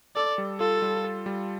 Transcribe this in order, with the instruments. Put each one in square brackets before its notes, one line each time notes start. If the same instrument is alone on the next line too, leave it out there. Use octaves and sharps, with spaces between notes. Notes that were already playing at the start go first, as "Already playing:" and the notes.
[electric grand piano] A4 [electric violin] D5
[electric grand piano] G3
[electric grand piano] F4 [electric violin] A4
[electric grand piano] G3
A4
G3